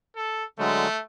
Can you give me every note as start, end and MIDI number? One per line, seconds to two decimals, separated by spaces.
0.16 0.44 69
0.59 0.88 50
0.59 0.88 54
0.59 0.88 56
0.59 1.01 57